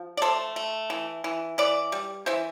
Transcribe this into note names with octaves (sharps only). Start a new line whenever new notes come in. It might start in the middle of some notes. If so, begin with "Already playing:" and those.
Already playing: F3
D5
A3 A4 C5
A3
E3
E3
E3 B4 D5
G3
E3 C5 E5